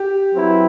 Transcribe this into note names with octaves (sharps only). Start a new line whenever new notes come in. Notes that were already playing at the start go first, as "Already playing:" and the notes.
Already playing: G4
F#3 C4 E4 B4